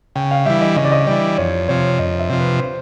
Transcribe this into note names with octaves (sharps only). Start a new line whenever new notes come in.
C#3 G5
F5
E3 G3 E5
D#5
C#3 D#5
D5
D#5
E3 G3 D5
F2 C#5
C3 F3 C#5
F2 D#5
E5
C3 F3
B4
C5